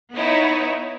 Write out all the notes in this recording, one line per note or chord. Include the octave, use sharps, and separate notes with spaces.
B3 D#4 E4 C#5